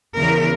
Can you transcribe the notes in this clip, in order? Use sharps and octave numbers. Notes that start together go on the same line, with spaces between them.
E2 C#3 E3 A#4